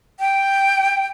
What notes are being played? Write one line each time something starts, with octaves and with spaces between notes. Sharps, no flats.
G5